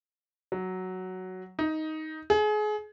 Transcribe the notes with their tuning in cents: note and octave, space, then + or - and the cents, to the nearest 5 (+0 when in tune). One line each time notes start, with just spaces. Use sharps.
F#3 +5
D#4 +10
G#4 +30